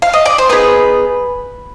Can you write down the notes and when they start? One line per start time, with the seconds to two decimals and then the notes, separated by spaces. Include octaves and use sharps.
0.02 F5
0.14 D#5
0.25 D5
0.38 C5
0.49 B3 D#4 G#4 B4